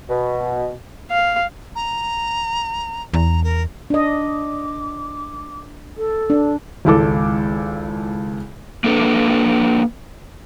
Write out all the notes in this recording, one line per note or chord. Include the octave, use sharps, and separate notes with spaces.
B2
F5
A#5
E2 A#5
A#4
D4 D#5
D6
A4
D4
G#1 C#2 E4 A4 D6
A#3 D4 A4 B4